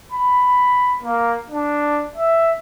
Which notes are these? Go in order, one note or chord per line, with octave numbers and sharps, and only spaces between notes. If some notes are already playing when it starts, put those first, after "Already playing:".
B5
A#3
D4
E5